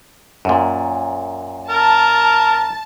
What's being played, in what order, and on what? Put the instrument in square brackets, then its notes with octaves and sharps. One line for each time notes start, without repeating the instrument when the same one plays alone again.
[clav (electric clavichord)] F#2 A#2
[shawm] A#4 [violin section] A5